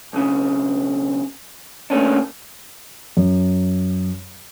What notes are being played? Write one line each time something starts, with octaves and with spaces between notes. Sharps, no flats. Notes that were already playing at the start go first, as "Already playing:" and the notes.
B1 C#3
C#3 A3 A#3 C#4 D4
F#2